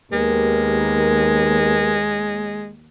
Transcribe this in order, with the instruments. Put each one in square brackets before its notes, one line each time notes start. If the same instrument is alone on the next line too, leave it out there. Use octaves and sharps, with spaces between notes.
[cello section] D#2 [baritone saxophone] G#3 [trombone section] B3 G4 A#4